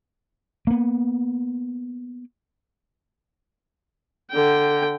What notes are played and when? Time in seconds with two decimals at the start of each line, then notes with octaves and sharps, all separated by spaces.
0.67 A#3 B3
4.31 D3 G5